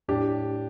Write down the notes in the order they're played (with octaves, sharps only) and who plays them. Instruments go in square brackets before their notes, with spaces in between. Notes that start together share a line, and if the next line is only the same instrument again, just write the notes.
[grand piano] A2 D4 G4